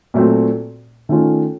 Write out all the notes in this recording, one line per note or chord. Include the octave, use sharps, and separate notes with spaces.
A#2 F#3 A3 C4
D#3 A3 C#4 F4